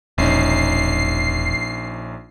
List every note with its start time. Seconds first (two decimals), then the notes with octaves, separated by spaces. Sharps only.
0.18 E1 A#1 C#4 D#4 C7